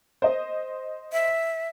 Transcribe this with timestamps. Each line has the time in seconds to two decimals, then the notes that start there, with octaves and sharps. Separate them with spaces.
0.22 C5 D#5
1.12 E5